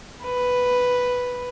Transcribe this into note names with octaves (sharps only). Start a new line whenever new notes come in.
B4